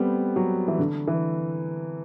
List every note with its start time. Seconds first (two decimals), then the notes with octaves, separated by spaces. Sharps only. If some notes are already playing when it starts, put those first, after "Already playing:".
Already playing: G3 A3 B3 C4
0.36 F#3
0.68 E3
0.79 D3
1.07 E3